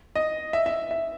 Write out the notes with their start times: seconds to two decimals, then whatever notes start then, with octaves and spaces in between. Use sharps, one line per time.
0.15 D#5
0.53 E5
0.66 E5
0.91 E5